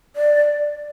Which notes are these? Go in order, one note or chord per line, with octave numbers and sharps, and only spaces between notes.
D5